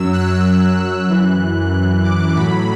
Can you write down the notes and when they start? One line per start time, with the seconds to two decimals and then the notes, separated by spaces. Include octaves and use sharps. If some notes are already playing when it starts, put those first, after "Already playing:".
Already playing: F#2 F#3 E6
0.13 F#6
1.08 F#2 E3
1.72 F#6
2.04 D6
2.35 A2 F#3 B5